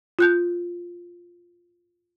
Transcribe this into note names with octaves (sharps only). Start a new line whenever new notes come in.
F4 F#6 G6